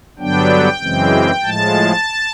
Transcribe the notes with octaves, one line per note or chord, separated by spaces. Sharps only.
G2 D3 F#3 B3 D4 G5
F#2 C#3 E3 G#3 C4
A2 F3 G#3 A5